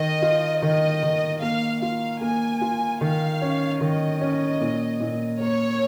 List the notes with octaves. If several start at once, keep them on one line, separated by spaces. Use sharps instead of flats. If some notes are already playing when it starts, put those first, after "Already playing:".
Already playing: D#3 D#5
F4
D#3 D#5
D#3
A#3 F5
F4 F5
A#3 G#5
F4
D#3 F5
C#4
D#3 D#5
C#4
A#2
A#2
A#3 C#5